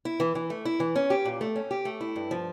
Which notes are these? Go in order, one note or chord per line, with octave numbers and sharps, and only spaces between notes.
E4
E3
E3
A3
E4
E3
C#4
G4
A#2
A3
C#4
G4
A3
E4
G2
F3